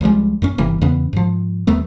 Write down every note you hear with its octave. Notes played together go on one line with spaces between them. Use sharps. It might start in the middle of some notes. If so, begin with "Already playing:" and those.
C2 F3 G3 G#3
F#2 A#3 C#4
G1 C3 E3 A#3
E2 C#3 B3 C#4
G#2 F3
D#2 F#3 A3 B3